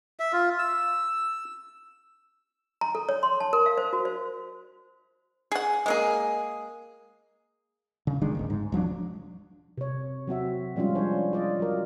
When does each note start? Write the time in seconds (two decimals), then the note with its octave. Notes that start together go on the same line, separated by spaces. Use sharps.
0.19 E5
0.32 F4
0.59 E6
2.81 A#5
2.95 A4
3.09 C#5
3.23 C6
3.40 A5
3.53 A#4
3.66 F5
3.78 C5
3.93 F#4
4.05 C5
5.51 G#4 F#5
5.86 G#3 A#3 G#4
8.07 C#3
8.21 F1 D#3 G#3 D4
8.35 G#1 D2 D#3
8.50 G#2
8.72 E1 F3 F#3 D4
9.77 C3 C#5
10.27 F#3 C4 F#4 E5
10.76 F3 G3 G#3 C#4 F4
10.95 F3 G3 D4 C5 C#5
11.33 F4 D5 D#5
11.60 F#3 A#4